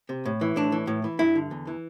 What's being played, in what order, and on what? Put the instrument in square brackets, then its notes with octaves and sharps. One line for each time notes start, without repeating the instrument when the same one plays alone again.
[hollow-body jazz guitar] C3
A2
E3
A2 D4
E3
A2
E3
G2 E4
D3
E2
E3